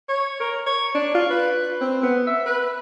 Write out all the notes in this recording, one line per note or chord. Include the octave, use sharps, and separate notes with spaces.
C#5
A#4
C#5
D4
F4
B4
C4
B3
E5
B4